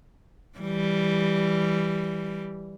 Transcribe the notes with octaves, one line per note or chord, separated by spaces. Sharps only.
E3 G3